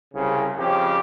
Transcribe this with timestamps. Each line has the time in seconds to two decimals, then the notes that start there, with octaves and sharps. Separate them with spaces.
0.14 C2 C#3
0.57 F2 C#3 G4